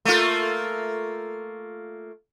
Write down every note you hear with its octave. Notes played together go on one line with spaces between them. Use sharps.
A3 A#3 F4